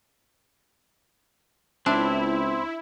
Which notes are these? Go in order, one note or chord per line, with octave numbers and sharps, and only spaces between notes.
C#2 C4 D4 E4